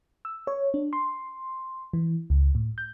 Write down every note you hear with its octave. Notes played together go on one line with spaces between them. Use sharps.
E6
C#5
D4
C6
E3
C#2
A2
G6